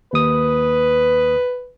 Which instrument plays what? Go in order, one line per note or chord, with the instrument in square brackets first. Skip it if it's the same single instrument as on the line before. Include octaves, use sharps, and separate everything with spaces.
[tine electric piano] D#2 D#6 [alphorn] B4